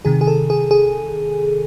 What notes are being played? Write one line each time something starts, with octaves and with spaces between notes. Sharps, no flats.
C3 D#3 G#4
G#4
A4
G#4
G#4